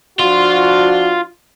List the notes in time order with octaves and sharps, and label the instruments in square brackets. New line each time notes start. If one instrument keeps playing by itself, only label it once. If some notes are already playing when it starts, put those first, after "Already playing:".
[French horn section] F3 D4 F#4 [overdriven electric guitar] F4